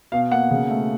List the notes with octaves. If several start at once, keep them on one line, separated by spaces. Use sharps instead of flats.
B2 F5
A#3 F#5
C#3
A3